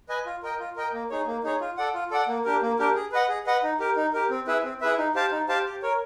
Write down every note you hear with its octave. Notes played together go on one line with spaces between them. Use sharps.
B4 D#5 G#5
F4
A#4 D#5 G5
F4
A#4 D#5 G5
A#3
D#4 G#4 C#5
A#3
D#4 G#4 C#5
F4
A4 D5 F#5
F4
A4 D5 F#5
A#3
D4 G4 A#4
A#3
D4 G4 A#4
G#4
B4 D#5 F#5
G#4
B4 D#5 F#5
D#4
G4 A#4
D#4
G4 A#4
C4
E4 G#4 B4 E5
C4
E4 G#4 B4 E5
D#4
G4 C5 F5 A5
D#4
G4 C5 F5 A5
G4
A#4 C#5